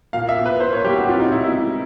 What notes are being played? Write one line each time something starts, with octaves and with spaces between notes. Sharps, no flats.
A#2 F5
E5
A#2
B4
A#3 C5
C#5
G3 G4
F#4
C4 F4
D#4
A#2 E4
E4
G#3